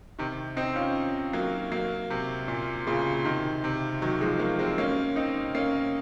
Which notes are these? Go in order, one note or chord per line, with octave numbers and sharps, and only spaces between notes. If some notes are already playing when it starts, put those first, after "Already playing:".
C3 D#3
C4 D#4
C#4 F4
F#3 A#3
F#3 A#3
C3
A#2
A#2 C#3
C3 D#3
C3
D#3 F#3
F3 G#3
F#3 A#3
G#3 C4
A#3 C#4
C4 D#4
A#3 C#4